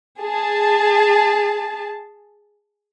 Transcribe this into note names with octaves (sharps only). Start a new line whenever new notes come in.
G#4 A5